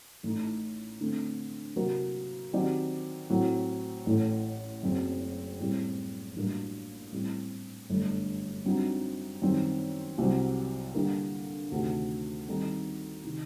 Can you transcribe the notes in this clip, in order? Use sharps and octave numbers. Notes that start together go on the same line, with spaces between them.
A1 A2 A3 D#4
D3 A3 C4
C3 F#3 A#3 F#4 A#4
D#3 F#3 C4 G4 D5
A2 F#3 C4
A1 A2 A3
F#1 F#2 F#3 C4
A2 G3 C4
A1 G2 F#3 A#3
A2 G3 C4
G1 F#2 D3 A3
G2 F#3 C4 D#4
F#2 D#3 G3 C4
C2 C3 F#3 C4
D3 G3 A#3
D2 C3 D#3
D#3 G3 C4 D#4 A4
C3 D#3